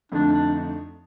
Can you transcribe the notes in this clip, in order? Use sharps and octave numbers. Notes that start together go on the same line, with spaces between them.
F2 D3 A3 D4 D#4
D4